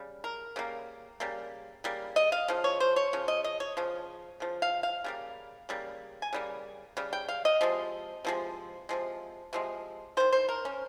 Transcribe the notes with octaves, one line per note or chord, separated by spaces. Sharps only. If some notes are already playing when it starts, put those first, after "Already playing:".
Already playing: C#3 G3
A#4
C#3 G3 A#3
C#3 G3 A#3
C#3 G3 A#3
D#5
F5
C#3 F3
C#5
C5
C#5
C#3 F3
D#5
D#5
C#5
C#3 F3
C#3 F3
F5
F5
C#3 G3 A#3
C#3 G3 A#3
G#5
C#3 G3 A#3
C#3 G3
G5
F5
D#5
C3 F3 G#3
C3 F3 G#3
C3 F3 G#3
C3 F3 G#3
D#3 G#3 C5
C5
A#4
C#4